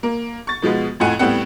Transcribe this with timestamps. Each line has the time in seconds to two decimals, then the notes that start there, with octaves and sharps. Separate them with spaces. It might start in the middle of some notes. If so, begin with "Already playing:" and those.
0.03 A#3
0.47 C#6 A6
0.62 B2 F3 G#3 B3
1.00 F2 A2 F3 F#5 G#5
1.19 A2 G3 B3 C4 F#5